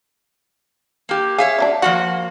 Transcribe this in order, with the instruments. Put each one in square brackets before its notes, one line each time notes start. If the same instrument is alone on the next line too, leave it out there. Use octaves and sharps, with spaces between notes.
[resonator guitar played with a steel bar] A#3 G4
[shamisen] G#4 [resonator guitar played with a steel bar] C#5 E5 F5
[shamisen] C#3 F#3 D4
[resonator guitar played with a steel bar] F3 A#3 F#4 [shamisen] F#5